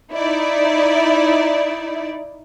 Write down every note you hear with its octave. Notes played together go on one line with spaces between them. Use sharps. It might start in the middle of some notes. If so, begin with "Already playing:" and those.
D#4 E4 D5